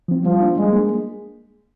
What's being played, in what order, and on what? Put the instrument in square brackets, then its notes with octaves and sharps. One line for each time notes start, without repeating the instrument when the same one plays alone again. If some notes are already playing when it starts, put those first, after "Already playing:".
[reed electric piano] F3 C4
[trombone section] F3 [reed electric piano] G3
[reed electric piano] A#3 D4 F4
[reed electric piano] G3 [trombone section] G#3
[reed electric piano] A#3 D4